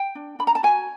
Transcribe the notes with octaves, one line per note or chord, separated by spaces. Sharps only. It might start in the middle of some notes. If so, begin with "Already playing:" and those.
Already playing: G5
D4
D4 B5
A#5
A5
F#4 G#5